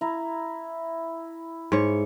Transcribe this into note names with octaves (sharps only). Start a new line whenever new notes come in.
E4 A#5
G#2 C#5